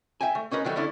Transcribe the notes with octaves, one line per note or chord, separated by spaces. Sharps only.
E5 G5 G#5
A3
C#4 D#4 A#4 B4
D#3 F#3 G3 A3
D3 A3 C#4 D4 E4